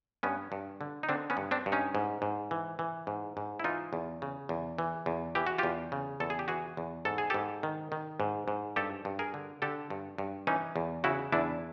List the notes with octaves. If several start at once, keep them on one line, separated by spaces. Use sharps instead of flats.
G2 B3 C#4
G2
D3
D#4
D3 C4 D4
B3 C#4
G2
C4 D4
G2
C#4 D#4
G#2
G#2
E3
E3
G#2
G#2
E4
E3 D#4 F4
E2
C#3
E2
E3
E2
E3 G4
F#4
E2 F4 G4
C#3
E2 A4
G#4
G4
E3 F#4 G#4
E2
G#2 A4
G#4
G#2 G4 A4
D#3
D#3
G#2
G#2
G2 G4 A4
G2
G#4 A#4
D3
D3 G4 A4
G2
G2
E3 C#4 D#4
E2
C#3 E4 F#4
E2 D4 E4